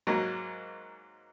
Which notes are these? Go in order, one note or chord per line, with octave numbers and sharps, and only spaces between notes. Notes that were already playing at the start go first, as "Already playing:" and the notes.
G#2 F#3 A#3